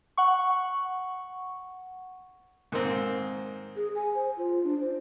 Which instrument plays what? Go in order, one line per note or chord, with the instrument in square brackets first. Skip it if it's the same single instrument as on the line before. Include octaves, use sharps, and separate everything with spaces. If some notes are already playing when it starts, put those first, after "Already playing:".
[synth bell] F#5 C#6
[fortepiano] G#2 D#3 A#3 C4
[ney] G#4
G#5
C5
F4
D4
C5